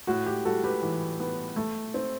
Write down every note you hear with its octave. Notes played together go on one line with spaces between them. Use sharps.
A2 F#4
G4
G3 F#4 A4
G4 B4
E3
B3
A3
C4